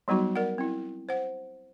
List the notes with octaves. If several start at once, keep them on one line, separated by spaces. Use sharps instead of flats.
F#3 G3 B3 D#4 F#4
A#4 D5 F#5
C4 E4
C5 F#5